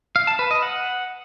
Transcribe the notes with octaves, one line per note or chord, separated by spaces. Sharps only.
F5
A5
B4
D#5
F#5